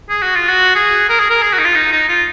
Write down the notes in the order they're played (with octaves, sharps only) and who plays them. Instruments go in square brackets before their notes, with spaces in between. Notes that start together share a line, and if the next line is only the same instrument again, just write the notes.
[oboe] G#4
F#4
F4
F#4
G#4
A#4
G#4
A#4
G#4
F#4
D#4
F4
D#4
D#4
F4